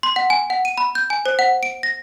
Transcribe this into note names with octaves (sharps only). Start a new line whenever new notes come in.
C6
F#5
G#5
F#5
D#7
B5
G6
G#5
C5
F#5
D7
A#6